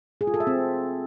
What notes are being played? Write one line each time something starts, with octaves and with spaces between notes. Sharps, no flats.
G#4
F4
A4
E5
C4